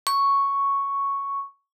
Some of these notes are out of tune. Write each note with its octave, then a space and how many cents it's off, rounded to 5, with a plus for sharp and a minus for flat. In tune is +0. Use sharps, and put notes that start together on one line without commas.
C#6 +0